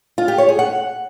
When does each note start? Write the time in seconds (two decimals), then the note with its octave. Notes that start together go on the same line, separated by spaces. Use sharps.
0.18 F4
0.28 G4
0.38 C#5
0.49 G#4
0.59 F#5